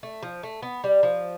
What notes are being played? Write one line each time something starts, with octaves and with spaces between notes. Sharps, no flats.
A3
F3
A3
B3
G3
F3